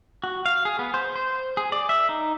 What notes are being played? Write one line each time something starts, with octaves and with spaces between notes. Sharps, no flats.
F#4
F5
G#4
B3
C5
C5
G#4
D5
E5
D#4